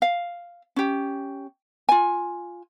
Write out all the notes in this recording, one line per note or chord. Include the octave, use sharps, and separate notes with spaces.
F5
C#4 G4
F4 G#5